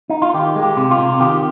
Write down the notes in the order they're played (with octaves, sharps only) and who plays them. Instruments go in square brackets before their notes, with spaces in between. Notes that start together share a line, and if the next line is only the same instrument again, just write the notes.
[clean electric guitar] D#4
F4
D#3 G4
G#3
G4
C3
F4
C3
D#3 G4